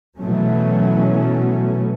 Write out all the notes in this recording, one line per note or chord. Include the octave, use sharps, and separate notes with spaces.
B2 E3 F#3 A3 C#4